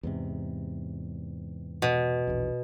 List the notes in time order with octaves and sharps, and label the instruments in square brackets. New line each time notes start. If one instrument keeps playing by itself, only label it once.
[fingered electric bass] E2 G#2 C3
[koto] B2
[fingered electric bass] A#1 E2